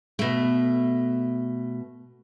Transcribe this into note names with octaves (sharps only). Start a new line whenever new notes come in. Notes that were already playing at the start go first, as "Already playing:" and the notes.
B2 A3